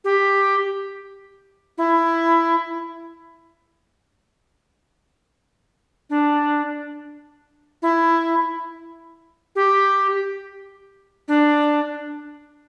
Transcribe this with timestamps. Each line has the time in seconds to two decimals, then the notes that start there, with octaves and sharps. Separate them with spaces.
0.04 G4
1.78 E4
6.10 D4
7.82 E4
9.56 G4
11.28 D4